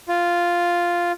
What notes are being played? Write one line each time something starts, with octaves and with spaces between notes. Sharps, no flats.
F4